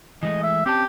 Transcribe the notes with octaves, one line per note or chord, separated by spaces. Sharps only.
E3 G#3 A3 D#5
E5
C4 C#4 G4 A5